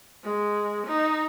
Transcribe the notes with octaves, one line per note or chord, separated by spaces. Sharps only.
G#3
D#4